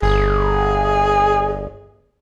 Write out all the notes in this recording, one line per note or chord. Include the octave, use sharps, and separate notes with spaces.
G1 G#4